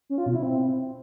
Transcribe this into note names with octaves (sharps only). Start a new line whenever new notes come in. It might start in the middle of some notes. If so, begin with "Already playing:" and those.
C#4
F4
B2
E4
C4